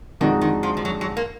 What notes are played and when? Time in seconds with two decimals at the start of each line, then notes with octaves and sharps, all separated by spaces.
0.21 F2 D3 D#3 G#3 D#4 F#4
0.41 D#3
0.63 F3
0.77 F3
0.85 F#3
1.01 F#3
1.17 A#3